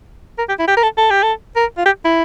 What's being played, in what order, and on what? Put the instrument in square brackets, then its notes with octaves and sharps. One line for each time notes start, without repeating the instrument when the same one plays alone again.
[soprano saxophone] A#4
G4
E4
G4
A#4
A4
A4
G4
A4
A#4
F4
G4
E4